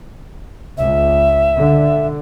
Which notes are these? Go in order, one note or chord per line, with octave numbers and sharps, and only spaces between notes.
C#2 E5
D3